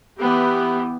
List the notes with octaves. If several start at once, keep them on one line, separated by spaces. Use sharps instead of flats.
E3 B3 G4